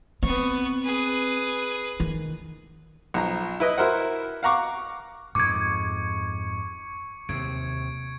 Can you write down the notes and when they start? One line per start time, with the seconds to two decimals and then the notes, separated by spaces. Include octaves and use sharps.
0.23 B3 C4 C#6
0.83 G#4 B4
2.00 D#3
3.14 B1 F3 A#5
3.60 E4 B4 D#5
3.78 E4 F#4 A#4 C5 F#5
4.43 F5 F#5 A#5 C#6 D6
5.35 F2 G#2 C#6 D6 G#6 C#7
7.29 D#2 C3 G#6 D7